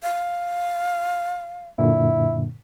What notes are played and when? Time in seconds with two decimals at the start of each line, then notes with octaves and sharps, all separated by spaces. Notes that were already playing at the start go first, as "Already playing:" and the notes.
0.03 F5
1.78 F#2 A#2 D3 E4